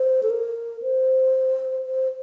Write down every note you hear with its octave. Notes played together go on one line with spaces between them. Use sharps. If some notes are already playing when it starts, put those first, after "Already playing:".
Already playing: C5
A4
A#4
C5
C5